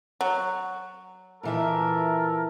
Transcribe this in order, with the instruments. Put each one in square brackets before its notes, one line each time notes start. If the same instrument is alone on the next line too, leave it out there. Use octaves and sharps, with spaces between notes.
[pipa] F#3
[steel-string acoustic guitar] A#2 E3 E5 [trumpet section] A4 A#4